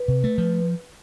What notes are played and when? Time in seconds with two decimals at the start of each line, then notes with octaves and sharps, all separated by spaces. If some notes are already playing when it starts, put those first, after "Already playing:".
Already playing: B4
0.08 C3
0.24 A3
0.38 F3